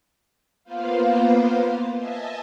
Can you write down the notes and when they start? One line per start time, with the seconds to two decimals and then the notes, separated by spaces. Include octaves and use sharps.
0.64 A#3 B3 F4 B4 C5 F5
1.94 D#5 E5 G#5 A5